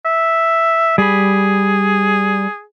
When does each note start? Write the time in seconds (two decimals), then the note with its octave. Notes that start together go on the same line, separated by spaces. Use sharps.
0.05 E5
0.98 G3 G#4 B5